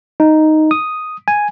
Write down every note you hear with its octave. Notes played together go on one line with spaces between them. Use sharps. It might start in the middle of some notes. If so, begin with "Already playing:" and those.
D#4
D#6
G#5